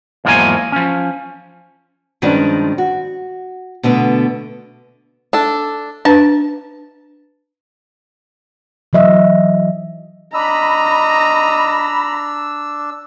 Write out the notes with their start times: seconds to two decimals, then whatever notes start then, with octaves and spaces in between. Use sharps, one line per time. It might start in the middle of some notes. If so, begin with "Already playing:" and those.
0.25 E2 G#2 F3 F#3 A#3 G#5
0.72 F3 C#4
2.22 G2 D#3 F3 G#3 C#4 D4
2.78 F#4
3.83 B2 D3 A3 B3
5.33 D4 A4
6.05 D4 B4 A5
8.93 E3 F#3 D#5 E5
10.34 D4 D#5 A#5 B5 E6